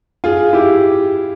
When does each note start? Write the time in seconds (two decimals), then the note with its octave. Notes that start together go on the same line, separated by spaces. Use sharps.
0.24 F4 G#4
0.53 E4 G4